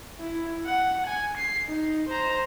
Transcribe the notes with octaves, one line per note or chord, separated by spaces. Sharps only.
E4
F#5
G#5
C7
D#4
C5 A#5